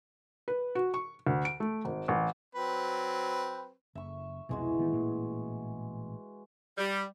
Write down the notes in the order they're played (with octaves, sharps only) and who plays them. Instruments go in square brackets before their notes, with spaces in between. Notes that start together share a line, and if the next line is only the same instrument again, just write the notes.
[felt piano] B4
F#4
C#6
D2
D7
A3
G#1
A1
[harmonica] F#3 C4 B4
[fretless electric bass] F#1 [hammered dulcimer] E5 C#6
[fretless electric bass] C2 F2 B2 [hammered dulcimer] E3 G#3 F#4
[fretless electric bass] A1 D#3 B3
A1 A#2 A#3
[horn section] G3